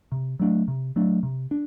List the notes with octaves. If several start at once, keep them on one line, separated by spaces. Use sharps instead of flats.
C3
F#3 A3 D4
C3
F#3 A3 D4
C3
D4